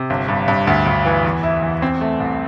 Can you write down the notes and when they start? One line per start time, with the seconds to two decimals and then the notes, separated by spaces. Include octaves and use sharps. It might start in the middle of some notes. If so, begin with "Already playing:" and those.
Already playing: C3
0.10 G1
0.28 G2
0.48 G2
0.67 D2
0.86 D2
1.05 E3
1.24 E2
1.43 E4
1.62 E2
1.82 C4
2.01 A3
2.20 C2